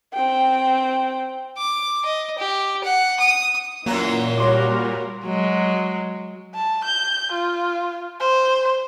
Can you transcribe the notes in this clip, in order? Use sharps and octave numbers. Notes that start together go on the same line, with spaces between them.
C4 G5
D6
D#5
G4
F#5
D#6
F#2 A#2 E3 F#3 A#3 A#5
G3 F#4 A#4 C#5 C6 D6
F#3 G#3
A5
G6
F4
C5